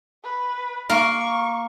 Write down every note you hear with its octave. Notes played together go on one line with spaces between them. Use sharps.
B4
A#3 A#4 C#6